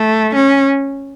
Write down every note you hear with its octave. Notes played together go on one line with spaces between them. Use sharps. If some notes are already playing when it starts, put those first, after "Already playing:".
Already playing: A3
C#4